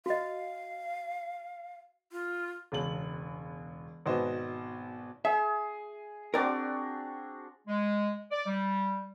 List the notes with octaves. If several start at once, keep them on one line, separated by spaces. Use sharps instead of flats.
F#4 D#5 F5
F4
E1 C#2 F#7
G#1 B2 B3 C5 D#5
G#4 E5
C4 D4 F#4 A#4 D5
G#3
D5
G3